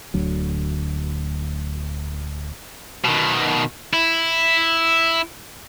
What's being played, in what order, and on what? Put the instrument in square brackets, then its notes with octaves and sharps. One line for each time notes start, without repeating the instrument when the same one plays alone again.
[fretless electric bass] D1 D2 D3 F#3
[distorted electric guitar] B2 D#3
E4